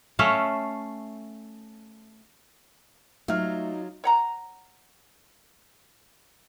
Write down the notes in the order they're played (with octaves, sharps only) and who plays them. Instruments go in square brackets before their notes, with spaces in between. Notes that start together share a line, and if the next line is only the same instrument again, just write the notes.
[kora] A3 C#4 E5 F5
[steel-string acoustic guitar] F#3 F4 [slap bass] A3 [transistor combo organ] D#4 [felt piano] E5 F6
[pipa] C#5 F#5 A#5